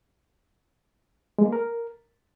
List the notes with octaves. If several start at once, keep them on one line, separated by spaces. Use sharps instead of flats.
G#3
A#3
A#4